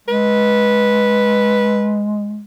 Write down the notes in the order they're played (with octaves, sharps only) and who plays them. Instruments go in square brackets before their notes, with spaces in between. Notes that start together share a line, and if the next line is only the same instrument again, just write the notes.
[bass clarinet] G#3 [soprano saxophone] B4